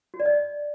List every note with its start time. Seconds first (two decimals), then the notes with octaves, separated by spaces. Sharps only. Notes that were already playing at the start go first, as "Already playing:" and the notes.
0.14 F#4
0.20 D5
0.25 D#5